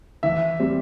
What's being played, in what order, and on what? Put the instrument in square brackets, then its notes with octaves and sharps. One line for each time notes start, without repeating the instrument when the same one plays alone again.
[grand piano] E3 [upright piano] E5
[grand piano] G3 C4